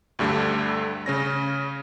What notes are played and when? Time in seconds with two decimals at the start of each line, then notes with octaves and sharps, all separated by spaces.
0.19 D2 G2 D3 G3 A3
1.06 C#3 C#4 A#6